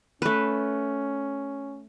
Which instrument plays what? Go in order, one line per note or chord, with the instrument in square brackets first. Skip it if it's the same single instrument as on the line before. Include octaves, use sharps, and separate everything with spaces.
[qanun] A3 B4 [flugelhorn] C#4